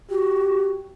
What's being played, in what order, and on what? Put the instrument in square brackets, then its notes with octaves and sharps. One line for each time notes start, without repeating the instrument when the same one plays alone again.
[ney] F#4 [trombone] G4